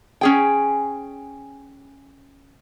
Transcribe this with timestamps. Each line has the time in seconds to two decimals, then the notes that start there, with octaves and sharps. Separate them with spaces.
0.21 C#4 G#4 G5